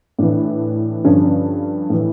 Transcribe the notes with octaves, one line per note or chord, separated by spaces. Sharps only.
A2 E3 D4
G2 D3 F3 C#4
C#4
A2 E3